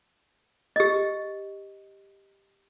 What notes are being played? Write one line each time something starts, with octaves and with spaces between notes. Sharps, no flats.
G4 D#5